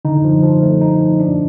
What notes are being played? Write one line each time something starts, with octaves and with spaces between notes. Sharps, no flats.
D3 D#4
F3
F3
A3
D#4
F3
D4